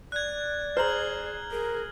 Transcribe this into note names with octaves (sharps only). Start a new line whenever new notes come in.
D5 F#6 G#6
G#4 C5 A#5 F6 F#7
G#4 A#4